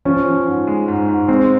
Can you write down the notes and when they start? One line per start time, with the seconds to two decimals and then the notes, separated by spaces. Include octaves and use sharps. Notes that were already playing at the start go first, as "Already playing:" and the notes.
0.05 F3 C#4
0.25 F3
0.46 G#2
0.67 G#3
0.88 G#2
1.08 G#2
1.28 G#3 C4